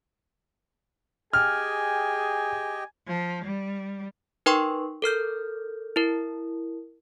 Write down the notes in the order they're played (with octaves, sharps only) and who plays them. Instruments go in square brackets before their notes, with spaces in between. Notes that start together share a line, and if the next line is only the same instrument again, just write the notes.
[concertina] G4 D#5 G5 [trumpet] G#4 [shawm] G#5 [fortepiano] F6
[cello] F3
G3
[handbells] D#4 A#4 B4 G5 C6 C#6
A4 A#4 F6 G6
E4 A#4